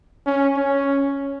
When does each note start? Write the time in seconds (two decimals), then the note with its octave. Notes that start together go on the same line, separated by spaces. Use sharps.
0.26 C#4
0.56 C#4